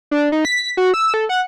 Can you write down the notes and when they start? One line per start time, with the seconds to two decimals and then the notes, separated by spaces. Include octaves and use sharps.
0.11 D4
0.32 D#4
0.45 B6
0.77 F#4
0.94 E6
1.14 A4
1.29 F#5